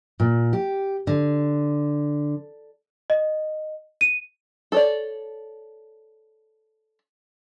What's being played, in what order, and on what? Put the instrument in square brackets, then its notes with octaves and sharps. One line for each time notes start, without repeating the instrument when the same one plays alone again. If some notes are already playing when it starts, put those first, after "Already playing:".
[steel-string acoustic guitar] A#2
G4
D3
[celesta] D#5
D#7
[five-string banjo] A4 C#5 D5